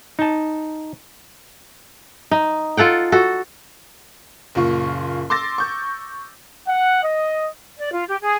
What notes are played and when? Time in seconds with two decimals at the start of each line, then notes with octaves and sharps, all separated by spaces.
0.19 D#4 A5
2.31 D#4
2.77 F4 A4 F#5 G5
3.12 F#4 A4
4.55 F#1 A#2 F4 C#6
5.30 C6 D6 E6 A6 A#6
5.58 C#6 G6
6.67 F#5
7.03 D#5
7.77 D5
7.92 F4
8.08 G4
8.21 G#4